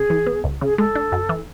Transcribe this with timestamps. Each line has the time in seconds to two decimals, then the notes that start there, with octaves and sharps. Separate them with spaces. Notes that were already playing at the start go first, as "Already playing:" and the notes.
Already playing: C#3 G#4
0.10 E3
0.26 B3
0.44 C#2
0.61 C#3 G#4
0.78 G#3 A4
0.95 D4
1.12 F#2
1.29 E3